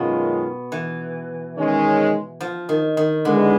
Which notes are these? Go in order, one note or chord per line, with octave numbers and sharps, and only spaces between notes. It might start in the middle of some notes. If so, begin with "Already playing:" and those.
Already playing: F#2 B2 D#3 G#3 C#4 F4
E3
D#3 G#3 C#4
F3
D#3
D#3
D3 G#3 B3 E4